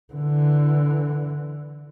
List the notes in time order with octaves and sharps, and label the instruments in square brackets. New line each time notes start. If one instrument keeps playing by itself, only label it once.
[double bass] D3 E3